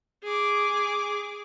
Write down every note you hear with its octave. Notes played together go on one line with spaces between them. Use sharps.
G#4 D6